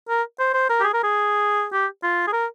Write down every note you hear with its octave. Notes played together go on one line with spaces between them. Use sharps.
A#4
C5
C5
A#4
G4
G#4
A#4
G#4
G4
F4
G#4
A#4